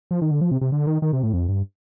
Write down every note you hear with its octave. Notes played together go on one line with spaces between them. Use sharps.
F3
D#3
D3
F3
C3
C3
D3
D#3
D#3
C3
A2
F2
G2